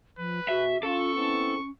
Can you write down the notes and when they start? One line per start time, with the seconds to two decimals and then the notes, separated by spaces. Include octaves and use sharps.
0.19 F3 B4
0.48 B2 F#4 G#4 E5
0.83 C#4 F4 A4 C#6
1.15 B3 C4 E4